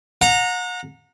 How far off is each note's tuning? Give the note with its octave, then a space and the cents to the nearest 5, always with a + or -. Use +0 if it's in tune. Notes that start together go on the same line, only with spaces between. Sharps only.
F#5 -35 A#5 -10